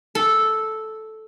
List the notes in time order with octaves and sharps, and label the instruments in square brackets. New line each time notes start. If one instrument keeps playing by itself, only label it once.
[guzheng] A4